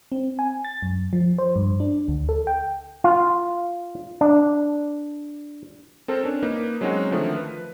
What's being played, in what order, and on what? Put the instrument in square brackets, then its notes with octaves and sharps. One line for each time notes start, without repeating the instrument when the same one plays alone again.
[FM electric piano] C4
G#5
A6
F#2
F3
C5
G2
D4
D2
A4
G5
[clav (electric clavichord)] F4
D4
[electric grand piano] C4 A4 A#4 C5
C#4 D4
A#3 D#4 B4
F#3 G#3 C4 C#4 D#4 F#4
D3 D#3 F3 A3
B4